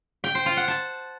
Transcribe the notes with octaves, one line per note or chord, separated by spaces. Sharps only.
G5
C5
F4
F#5
A5